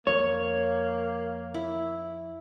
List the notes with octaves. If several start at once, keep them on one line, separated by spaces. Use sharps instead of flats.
F2 A#3 C#5
E4